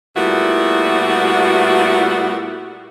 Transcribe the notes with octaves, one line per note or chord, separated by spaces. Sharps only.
A#2 G3 A3 B3 E4 F#4